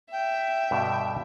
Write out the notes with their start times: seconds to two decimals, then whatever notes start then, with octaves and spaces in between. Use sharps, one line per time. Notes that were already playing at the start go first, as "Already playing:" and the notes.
0.12 E5 G5
0.71 G2 B2 D3